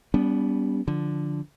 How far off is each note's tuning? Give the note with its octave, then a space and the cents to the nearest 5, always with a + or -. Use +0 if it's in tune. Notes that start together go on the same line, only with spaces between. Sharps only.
G3 +0 B3 +0 D4 -45
D3 +0 F3 +0